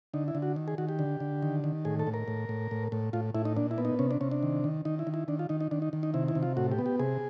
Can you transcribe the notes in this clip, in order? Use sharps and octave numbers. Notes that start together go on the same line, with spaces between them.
D3 D#4
E4
D3
F#4
D#3
G#4
D#3 F#4
G4
D3
D3
D#3
D#3
A2 G#4
A4
A2
A#4
A2
A2
A2
A2
A2 F4
A2 E4
D#4
A#2 D4
E4
B3
D#4
C3 C#4
D4
C3 C#4
D4
D#3
D#3
D#3 D#4
E4
D#3
E4
D#3 D4
F4
D#3 D#4
D#4
D#3 D4
D#4
D#3
D#4
C3 E4
E4
C3
F4
A2 F#4
G4
B3
G4
C3 G#4